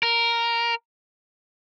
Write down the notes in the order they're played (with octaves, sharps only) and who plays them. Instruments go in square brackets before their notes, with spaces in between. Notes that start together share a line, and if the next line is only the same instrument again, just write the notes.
[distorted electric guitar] A#4